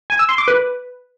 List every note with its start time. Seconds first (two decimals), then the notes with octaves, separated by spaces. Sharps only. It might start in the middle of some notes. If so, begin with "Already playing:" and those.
0.10 G#5
0.19 E6
0.29 C6
0.38 D6
0.48 B4